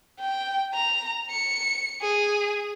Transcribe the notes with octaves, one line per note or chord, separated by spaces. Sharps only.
G5
A#5
C#7
G#4